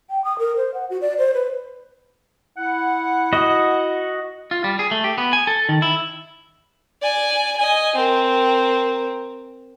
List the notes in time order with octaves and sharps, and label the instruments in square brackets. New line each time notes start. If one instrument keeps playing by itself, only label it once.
[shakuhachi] G5
D#6
A#4
C5
F#5
F#4
D5
C5
B4
[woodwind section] E4 F#5
[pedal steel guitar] F#4 D#5
[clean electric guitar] F4
G3
G#4
A3
G4
B3
G#5
A4
D#3
E4
[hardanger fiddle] D5 G#5
D#5 G#5
C4 A#4